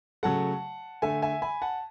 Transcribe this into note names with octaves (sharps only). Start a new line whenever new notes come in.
C#3 F#3 A3 F#5 A5
D3 A3 E5 G#5
E5 G#5
G#5 B5
F#5 A5